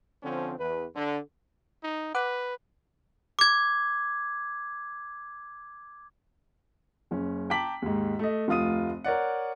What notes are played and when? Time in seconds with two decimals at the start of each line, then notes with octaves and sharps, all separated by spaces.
0.23 D3 F3 C4 C#4
0.58 E2 B4
0.95 D3
1.84 D#4
2.15 B4 F#5 D6 F#6
3.39 D6 G#6
7.11 F#1 C#4
7.50 G5 A5 A#5 D6 B6 F#7
7.82 D#2 G#2
8.19 A3 D#5
8.48 F1 D2 F4 D#6 D#7
9.04 A#4 C#5 D5 F#5